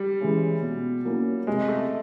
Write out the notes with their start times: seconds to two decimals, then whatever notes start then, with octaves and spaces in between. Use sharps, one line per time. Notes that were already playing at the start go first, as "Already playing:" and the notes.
Already playing: G3
0.20 E3 G#3 C#4
0.63 B2
1.04 F#3 A#3 C#4 E4
1.47 C3 G#3
1.68 A3